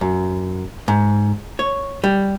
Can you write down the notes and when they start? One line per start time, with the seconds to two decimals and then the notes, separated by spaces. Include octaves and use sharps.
0.01 F#2
0.88 G#2
1.59 C#5
2.04 G3